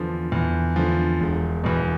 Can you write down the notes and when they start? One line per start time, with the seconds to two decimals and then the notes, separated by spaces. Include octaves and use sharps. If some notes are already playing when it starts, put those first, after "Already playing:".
Already playing: E2 D3 F3
0.32 E2
0.76 D3 F3
1.21 E1
1.64 E2 B2